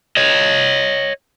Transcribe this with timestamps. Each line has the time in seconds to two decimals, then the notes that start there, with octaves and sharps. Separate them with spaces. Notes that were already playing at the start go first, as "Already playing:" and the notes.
0.17 C#5 D#5